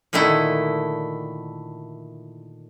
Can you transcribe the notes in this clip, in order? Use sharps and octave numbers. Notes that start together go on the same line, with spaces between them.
A#2 D3 D#3 A3 E4